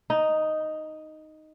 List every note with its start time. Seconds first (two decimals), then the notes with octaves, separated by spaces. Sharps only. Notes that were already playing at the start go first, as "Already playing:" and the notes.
0.10 D#4